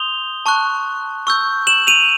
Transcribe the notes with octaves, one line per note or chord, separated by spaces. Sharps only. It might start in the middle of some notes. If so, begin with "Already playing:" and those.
Already playing: C6 D#6 G6 F7 G7
A5 C#6 F#6
C#6 E6 G6
E7 F#7
D#7 F7